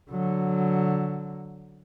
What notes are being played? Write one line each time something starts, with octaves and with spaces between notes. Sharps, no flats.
D3 F#3